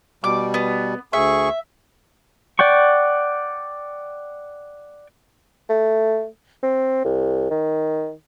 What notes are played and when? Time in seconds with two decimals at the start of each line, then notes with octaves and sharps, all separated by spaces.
0.24 B2 G3 D6
0.54 B3
1.13 D2 G#4 E5 C#6
2.59 D5 F#5 G5 C#6
5.70 A3
6.63 C4
7.05 C2
7.51 D#3